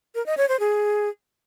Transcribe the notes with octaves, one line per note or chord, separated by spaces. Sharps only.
A#4
D#5
C#5
C5
G#4